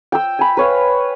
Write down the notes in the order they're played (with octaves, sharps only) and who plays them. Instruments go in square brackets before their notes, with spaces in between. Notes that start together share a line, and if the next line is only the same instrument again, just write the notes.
[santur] G5 E6
G#5 B5
B4 C#5 F5